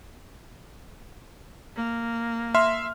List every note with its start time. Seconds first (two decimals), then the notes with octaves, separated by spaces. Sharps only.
1.76 A#3
2.55 E5 C6 F6